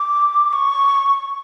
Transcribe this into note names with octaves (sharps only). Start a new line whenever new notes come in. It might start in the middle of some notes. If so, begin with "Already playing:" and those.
Already playing: D6
C#6